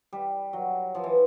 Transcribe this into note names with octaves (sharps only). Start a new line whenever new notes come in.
G3
F#3
F3
E3